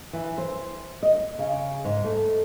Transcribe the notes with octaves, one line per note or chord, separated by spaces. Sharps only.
E3
C5
D#5
C#3
G#2
A3